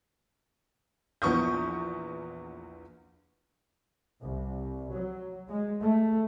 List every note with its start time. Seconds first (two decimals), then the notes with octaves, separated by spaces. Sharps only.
1.22 A#1 E2 B3 C#6 D#6 G6
4.21 C2
4.93 F#3
5.49 G#3
5.82 A3